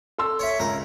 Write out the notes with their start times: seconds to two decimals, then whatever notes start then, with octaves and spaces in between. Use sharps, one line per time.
0.18 A4 C6 E6
0.39 C#5 E5
0.59 C#2 A#4